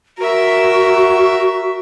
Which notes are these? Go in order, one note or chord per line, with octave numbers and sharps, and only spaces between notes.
F#4 A#4 E5